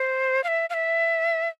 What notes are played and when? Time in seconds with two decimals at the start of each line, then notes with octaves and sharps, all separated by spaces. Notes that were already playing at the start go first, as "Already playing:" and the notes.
Already playing: C5
0.44 F5
0.48 E5
0.70 F5
0.74 E5